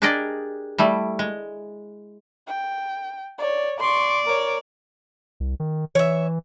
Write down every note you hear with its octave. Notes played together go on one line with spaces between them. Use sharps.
D4 G4 G#4 A#4 D5 D#5
G3 A3 E4
G#3
G5
C#5 D5
D5 C6 C#6
A#4 C#5
C2
D#3
E3 C#5 E5